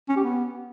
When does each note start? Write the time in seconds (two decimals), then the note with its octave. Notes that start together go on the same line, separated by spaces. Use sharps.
0.09 C#4
0.16 G4
0.24 B3